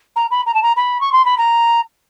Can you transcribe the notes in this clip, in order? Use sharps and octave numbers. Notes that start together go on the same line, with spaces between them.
A#5
B5
A#5
A5
A#5
B5
C#6
C6
B5
A#5